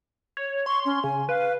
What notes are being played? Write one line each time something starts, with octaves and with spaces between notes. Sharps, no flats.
C#5
C6 C#6
C#4
C#3 G#5
B4 F5